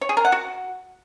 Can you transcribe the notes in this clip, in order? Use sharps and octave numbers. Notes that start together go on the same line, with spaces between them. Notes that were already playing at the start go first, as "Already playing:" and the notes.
C#5
G#4
A#4
F#5
F#4